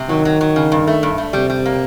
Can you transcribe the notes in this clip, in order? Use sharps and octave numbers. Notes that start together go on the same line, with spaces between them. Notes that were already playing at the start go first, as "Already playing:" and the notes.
Already playing: C3
D#3 F#3
F#3
F#3
C#3
G2
A3
G2
A3
C3 G3
G3
A#3